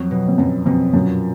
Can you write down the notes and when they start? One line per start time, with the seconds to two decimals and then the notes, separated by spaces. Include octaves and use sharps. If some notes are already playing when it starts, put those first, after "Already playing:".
Already playing: F2 F#3 F#4
0.11 B2
0.28 F2
0.38 F#2 B2
0.66 F2 B2
0.94 F#2 A#2